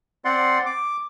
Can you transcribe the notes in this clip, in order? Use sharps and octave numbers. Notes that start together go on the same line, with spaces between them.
C4 D5 F#5 C6
D6